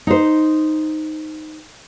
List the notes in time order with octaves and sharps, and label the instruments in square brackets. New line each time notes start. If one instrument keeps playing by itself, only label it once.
[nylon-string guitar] D#4 C5